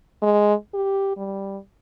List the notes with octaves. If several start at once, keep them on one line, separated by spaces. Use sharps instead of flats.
G#3
G4
G3